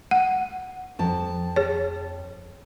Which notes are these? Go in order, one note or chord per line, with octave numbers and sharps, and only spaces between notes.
F#5
F2 A5
G#4 C#5